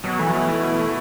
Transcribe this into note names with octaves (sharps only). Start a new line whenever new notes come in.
B2 F#3
E3 A3 E4
B2
A3 E4
B2
A3 E4